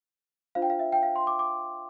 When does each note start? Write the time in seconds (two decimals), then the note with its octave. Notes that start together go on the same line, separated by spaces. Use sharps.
0.55 D4 F4 C5 F5
0.62 G5
0.70 F5
0.79 E5
0.93 G5
1.03 F5
1.16 C6
1.27 D6
1.39 D6